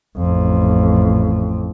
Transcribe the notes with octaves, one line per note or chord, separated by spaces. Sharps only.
A1 F2